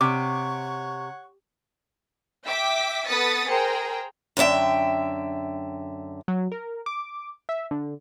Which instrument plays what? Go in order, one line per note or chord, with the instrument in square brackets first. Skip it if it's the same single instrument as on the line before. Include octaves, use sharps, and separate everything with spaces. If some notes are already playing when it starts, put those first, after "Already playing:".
[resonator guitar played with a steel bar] C3 [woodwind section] C#5 F#5 C#6 [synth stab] D6
[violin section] E5 G5 D6 B6
B3 A4 D#6 A6 B6 C#7
G#4 A#4 C5 G5 A#5
[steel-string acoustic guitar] F#2 D3 D4 E5 G5
[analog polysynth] F#3
A#4
D6
E5
D3